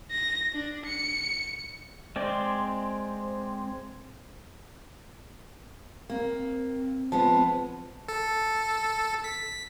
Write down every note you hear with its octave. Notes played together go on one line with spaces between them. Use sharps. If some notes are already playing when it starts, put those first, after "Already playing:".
A#6
D4
C#7
G#3 C4 D5
A#3 C4
F3 G#3 B3 A5
A4
B6